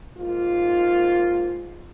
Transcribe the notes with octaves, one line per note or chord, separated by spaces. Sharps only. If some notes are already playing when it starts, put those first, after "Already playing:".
G#2 D#3 A#3 F4